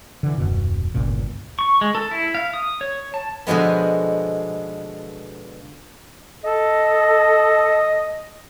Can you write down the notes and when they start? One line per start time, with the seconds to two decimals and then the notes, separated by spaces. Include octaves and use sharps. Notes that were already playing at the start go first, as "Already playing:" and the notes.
0.23 D3 E3
0.38 D#1 F#2 B2
0.94 G1 C#2 A#2
1.59 C#6
1.81 G#3
1.95 A4
2.11 E4
2.35 F5
2.54 D#6
2.81 C#5
3.14 A5
3.47 B2 D3 F3 G#3 B3
6.44 A4 D#5